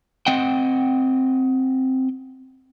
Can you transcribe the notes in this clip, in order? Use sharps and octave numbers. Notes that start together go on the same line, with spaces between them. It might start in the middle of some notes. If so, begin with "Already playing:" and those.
C4 D#5 F#5 G5